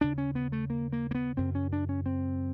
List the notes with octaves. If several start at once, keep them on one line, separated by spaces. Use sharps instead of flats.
D#2 C#3 D4
C#4
B3
A3
A#3
A#3
A#3
B3
F#2 C#3 C4
C#4
D4
C#4
C4